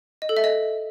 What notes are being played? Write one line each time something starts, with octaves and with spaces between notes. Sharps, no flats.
D#5
A4
E5
D#5